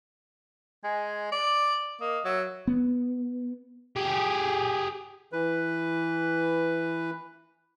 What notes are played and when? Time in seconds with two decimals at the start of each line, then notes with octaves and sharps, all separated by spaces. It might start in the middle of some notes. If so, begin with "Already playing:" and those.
0.84 G#3 G#5
1.32 D5 D6
2.01 A#3 D#5
2.25 F#3 E5
2.67 B3
3.96 G4 G#4
5.33 E3 B4